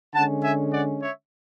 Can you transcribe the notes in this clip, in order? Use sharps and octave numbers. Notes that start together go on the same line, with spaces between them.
D3 G#3 C#4 F#5 A5
E5 G#5
D5 F#5
C#5 E5